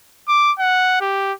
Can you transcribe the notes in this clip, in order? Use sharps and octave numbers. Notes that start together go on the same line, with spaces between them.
D6
F#5
G4